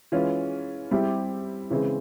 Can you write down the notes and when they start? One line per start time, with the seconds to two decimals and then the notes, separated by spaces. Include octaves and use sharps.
0.12 E3 G#3 C#4 F4
0.91 G3 C4 E4 G4
1.70 C#3 E3 G#3 C4